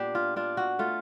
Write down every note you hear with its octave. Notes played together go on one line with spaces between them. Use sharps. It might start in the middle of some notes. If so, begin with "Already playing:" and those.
Already playing: A#2 B3 D4 G4
F4
D4 F4
F#4
A3 F4